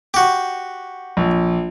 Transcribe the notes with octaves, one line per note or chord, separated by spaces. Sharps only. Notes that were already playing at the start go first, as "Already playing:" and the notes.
F#4 G4
A#1